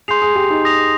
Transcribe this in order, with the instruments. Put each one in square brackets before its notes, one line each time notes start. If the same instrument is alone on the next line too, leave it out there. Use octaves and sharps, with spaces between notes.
[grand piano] G#4 [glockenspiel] C6 G6 C7 F7
[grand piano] G#4
G4
D#4
[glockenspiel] D#6 A#6 F7